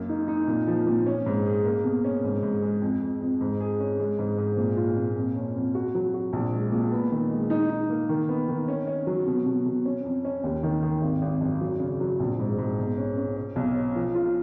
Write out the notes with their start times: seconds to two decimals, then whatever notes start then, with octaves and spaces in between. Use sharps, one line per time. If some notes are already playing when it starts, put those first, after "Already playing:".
Already playing: F#2 A#3
0.09 D#4
0.28 D#4
0.47 A#2
0.67 F3
0.87 A#2
1.06 C#4
1.26 G#2
1.45 G#4
1.65 A#3
1.84 B2
2.04 C#4
2.24 G#2
2.43 G#2
2.62 G#3
2.82 F2
3.01 F2
3.21 F2
3.41 G#2
3.60 G#4
3.80 C#4
3.99 G#3
4.19 G#2
4.38 G#2
4.57 A#2
4.77 F4
4.97 A#2
5.16 F2
5.36 C#4
5.56 F2
5.75 F#4
5.95 F#3
6.14 F#4
6.33 A#1
6.53 G#3
6.72 A#2
6.92 B3
7.11 D#3
7.31 G#3
7.50 D#4
7.70 D#4
7.89 A#3
8.09 D#3
8.29 B3
8.48 D#3
8.68 C#4
8.87 C#4
9.07 F#3
9.27 B2
9.46 B2
9.66 B2
9.85 C#4
10.04 F2
10.25 C#4
10.44 D#2
10.63 D#3
10.83 D#3
11.02 G#1
11.22 G#1
11.41 F#2
11.61 F#3
11.80 C#3
12.00 F#3
12.20 A#1
12.39 G#2
12.58 G#2
12.79 B1
12.98 C#4
13.17 C#4
13.36 C#4
13.56 B1
13.76 C#4
13.96 F3
14.15 F4